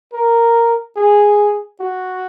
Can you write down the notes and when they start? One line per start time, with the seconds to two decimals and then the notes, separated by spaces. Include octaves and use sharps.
0.13 A#4
0.97 G#4
1.80 F#4